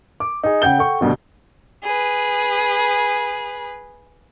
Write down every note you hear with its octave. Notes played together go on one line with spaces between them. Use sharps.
D6
D#4 G#4
C#3 F#5 G5 G6 G7
A4 F#5 G5 C#6
D2 G2 B2 D3
G#4 B4